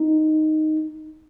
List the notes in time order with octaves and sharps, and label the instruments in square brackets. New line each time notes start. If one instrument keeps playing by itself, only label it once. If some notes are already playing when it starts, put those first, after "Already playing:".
Already playing: [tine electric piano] D#4